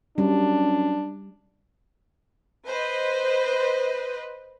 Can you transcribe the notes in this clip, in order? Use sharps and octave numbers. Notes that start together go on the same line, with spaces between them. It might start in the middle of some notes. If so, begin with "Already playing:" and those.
F#2 G3 D4
B4 C5 D#5